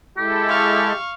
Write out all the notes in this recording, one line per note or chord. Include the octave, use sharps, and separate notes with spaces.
G#3 E4 G4 A4
F5 C#6